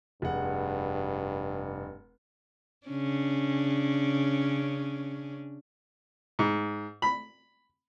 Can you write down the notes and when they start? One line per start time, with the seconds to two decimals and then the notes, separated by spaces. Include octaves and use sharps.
0.22 F1 G2 G#4 F#5
2.87 C#3 C#4 D4
6.39 G#2
7.02 B5